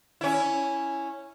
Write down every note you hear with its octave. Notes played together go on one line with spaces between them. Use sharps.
C#4 E4